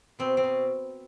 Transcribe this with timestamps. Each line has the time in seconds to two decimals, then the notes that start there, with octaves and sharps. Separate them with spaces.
0.19 B2 C4
0.37 C4
0.43 B2